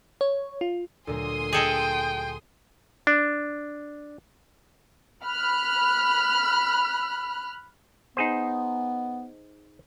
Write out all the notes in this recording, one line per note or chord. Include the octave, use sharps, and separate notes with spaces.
C#5
F4
D2 A#2 F#3 G#5 C6 D#6
G#4 A4 D#5 G5 D7
D4
B5 F6 F#6
B3 D#4 G#4 C5